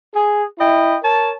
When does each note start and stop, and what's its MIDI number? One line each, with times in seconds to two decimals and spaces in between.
0.14 0.44 68
0.59 0.97 64
0.59 0.97 75
0.59 0.97 79
0.59 0.97 83
1.04 1.34 70
1.04 1.34 73
1.04 1.34 81